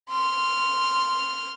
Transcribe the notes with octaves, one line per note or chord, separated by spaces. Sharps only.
C6 F6